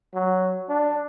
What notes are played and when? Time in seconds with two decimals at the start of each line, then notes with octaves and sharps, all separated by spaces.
0.14 F#3
0.69 D4